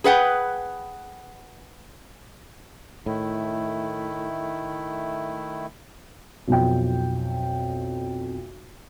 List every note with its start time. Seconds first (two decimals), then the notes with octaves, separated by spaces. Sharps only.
0.04 G#4 B4 F#5 G5
3.06 A2 D#3 A3 E4
6.48 B1 F2 G5